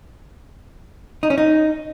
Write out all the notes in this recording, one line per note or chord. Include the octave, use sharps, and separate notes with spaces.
D#4
C#4
D#4